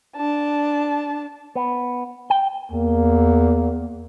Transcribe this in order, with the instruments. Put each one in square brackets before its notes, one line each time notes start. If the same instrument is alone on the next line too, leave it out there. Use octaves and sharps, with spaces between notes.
[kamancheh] D4 A5
[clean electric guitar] B3
G5
[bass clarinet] E2 [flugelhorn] A#3